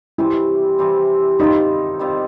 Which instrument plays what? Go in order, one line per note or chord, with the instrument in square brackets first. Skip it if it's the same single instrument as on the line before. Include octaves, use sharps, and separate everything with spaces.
[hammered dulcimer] C3 E3 G3 C4 [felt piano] E4
[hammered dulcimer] C3 E3 G3 C4
[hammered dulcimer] D#3 G3 C4 F4 [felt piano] D#4
[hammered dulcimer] D#3 G3 C4 F4